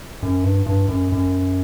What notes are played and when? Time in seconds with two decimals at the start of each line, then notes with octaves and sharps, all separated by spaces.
0.23 F#2
0.44 G2
0.66 G2
0.88 F#2
1.12 F#2